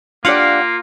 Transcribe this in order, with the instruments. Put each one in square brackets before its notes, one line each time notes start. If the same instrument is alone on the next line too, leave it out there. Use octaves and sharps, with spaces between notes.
[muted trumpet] A#3 [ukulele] D4 G4 D5 [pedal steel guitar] F4 [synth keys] F5 F#5